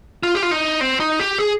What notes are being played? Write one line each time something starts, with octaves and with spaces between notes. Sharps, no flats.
F4
G4
F4
D#4
C4
D#4
G4
G#4